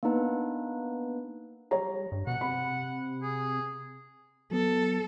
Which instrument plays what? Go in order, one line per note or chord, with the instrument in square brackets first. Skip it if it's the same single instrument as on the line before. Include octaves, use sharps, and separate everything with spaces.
[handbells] A#3 B3 D4 D#4 B4
[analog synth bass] G3 [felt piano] C#5 A#5
[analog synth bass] G2
[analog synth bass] B2 [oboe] F#5
[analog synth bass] C3 [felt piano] B5
[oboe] G#4
[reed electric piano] F#3 B3 [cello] A4